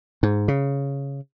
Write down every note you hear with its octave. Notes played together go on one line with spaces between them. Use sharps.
G#2
C#3